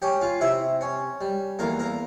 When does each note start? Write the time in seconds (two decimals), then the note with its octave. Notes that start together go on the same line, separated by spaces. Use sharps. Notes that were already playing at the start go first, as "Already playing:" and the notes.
0.02 C#4 G4 G5
0.21 F4 F5
0.41 C3 E4 E5
0.81 C#4
1.21 G3
1.59 E2 A#3 A#4
1.79 A#3 A#4